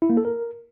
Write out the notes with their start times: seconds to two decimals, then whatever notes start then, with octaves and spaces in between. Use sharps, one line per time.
0.02 E4
0.10 A#3
0.17 A4
0.25 A#4